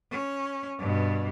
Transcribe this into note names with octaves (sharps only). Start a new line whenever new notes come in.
C#4
G2 B2